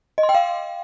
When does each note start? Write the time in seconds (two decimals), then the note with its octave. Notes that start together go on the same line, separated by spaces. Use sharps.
0.18 D#5
0.23 C6
0.29 G5
0.35 F5